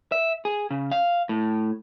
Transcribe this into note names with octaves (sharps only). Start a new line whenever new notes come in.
E5
G#4
C#3
F5
A2